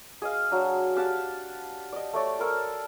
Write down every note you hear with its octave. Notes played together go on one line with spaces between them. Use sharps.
G#4 D#5 F5
F#3 D4
G4 F5 F#5 A5
D5 D#5
A3 C#5 D5
A4 A#4 C5 G#5